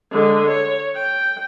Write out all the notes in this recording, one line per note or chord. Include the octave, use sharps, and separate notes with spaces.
D3 G#3
C#5
G5